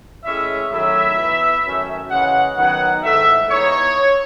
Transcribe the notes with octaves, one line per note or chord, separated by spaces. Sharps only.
A2 G#3 C#4 E4 E5
D#3 F#3 A3 E4 E5
E3 B3 E4
F#2 D#3 A3 C#4
C#3 E3 G#3 F#5
D#3 F#3 B3 D#4 F#5
G#2 D#3 A3 E4 E5
E3 B3 D#4 C#5